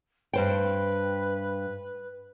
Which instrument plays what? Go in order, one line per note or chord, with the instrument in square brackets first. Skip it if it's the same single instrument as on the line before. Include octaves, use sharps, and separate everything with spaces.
[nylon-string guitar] G2 C5 G5 [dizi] B4